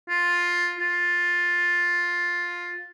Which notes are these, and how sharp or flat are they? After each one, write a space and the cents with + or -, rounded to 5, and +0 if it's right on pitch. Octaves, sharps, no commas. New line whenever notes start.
F4 +10
F4 +10